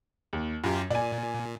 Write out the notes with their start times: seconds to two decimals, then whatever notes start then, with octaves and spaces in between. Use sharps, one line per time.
0.33 D#2
0.64 F#2 F4 G4
0.90 A#2 D5 G#5